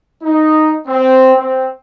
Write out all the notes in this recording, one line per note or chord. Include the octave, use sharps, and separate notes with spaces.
D#4
C4
C4